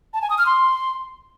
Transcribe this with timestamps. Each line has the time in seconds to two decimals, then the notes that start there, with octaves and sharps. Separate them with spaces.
0.14 A5
0.22 G#5
0.30 D#6
0.38 F6
0.46 C6